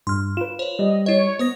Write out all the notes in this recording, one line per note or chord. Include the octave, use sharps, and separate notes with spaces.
G2 C6 F6
F4 B4 E7
C5 C#5
G3 D#5
E4 C#5 D#5
B3 C5 D#6 A#6